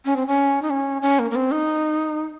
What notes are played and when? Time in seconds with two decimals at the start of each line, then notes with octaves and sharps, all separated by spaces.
0.05 C#4
0.16 C4
0.27 C#4
0.62 D#4
0.70 C#4
1.02 C#4
1.19 A#3
1.31 A#3
1.35 C4
1.51 D#4